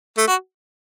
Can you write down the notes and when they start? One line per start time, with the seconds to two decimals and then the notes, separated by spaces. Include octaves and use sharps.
0.18 A3
0.27 F#4